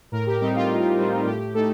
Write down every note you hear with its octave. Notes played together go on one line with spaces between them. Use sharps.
A2 A#4
G4
G3 C4 D#4 G4
F4
A2
G3 C4 D#4
A2 G4
A3 D#4 A4